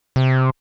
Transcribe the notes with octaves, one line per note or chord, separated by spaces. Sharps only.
C3